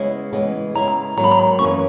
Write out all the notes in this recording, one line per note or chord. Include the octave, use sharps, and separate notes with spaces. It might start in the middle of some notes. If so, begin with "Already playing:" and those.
Already playing: C#3 G#3 B3 E4
C#3 E3 G#3 B3
C#3 G#3 B3 E4 A#5
G#2 D#3 F#3 A#3 A#5
B5
A#5
F#2 E3 A#3 C#4 C#6